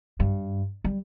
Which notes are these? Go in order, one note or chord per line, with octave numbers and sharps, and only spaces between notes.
G2
G3